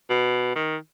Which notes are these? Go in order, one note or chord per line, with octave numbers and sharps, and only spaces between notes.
B2
D#3